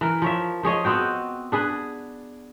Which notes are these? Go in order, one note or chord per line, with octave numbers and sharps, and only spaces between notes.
E3 A#4
F3 C#5 E5
F3 G#4 C#5 D#5
B3 C4 F#4 G5
D4 G#4 B4